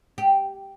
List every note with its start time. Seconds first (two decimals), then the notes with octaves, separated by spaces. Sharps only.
0.18 G4